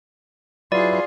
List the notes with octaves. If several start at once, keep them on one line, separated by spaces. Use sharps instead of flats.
F#3 E4 F4 G#4 B4 D5